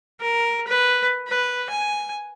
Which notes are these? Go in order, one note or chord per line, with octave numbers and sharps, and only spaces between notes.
A#4
B4
B4
G#5